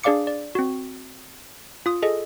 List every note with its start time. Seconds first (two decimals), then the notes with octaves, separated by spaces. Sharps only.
0.04 D4 G#4 D5 F5 D6 C#7
0.27 D5
0.55 C4 F#4
1.86 F4 D#6
2.03 G#4 A4 D#5